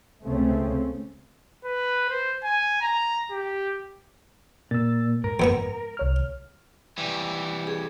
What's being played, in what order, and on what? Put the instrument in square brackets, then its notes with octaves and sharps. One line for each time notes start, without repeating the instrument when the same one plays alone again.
[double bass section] C#2 C#3 A3 C4 C#4
[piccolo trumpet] B4
C5
G#5
A#5
G4
[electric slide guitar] A#2 [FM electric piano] E6 A6
[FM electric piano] G#2 [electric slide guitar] A#4
[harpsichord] F2 B3 C#6
[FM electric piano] C2 C#5 F6
[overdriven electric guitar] E3 G3
[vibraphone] G#4